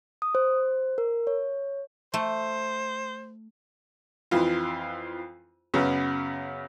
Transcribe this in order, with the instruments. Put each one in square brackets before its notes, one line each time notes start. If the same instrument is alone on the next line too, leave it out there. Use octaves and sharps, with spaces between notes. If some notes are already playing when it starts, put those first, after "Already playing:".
[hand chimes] D#6
C5
A#4
C#5
[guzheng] A3 [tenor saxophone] C5
[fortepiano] F2 E3 F4
F#2 C#3 B3